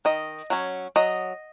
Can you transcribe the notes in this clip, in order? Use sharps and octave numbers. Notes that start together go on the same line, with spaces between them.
D#3 D#5
F#3 C#4
F#3 D#5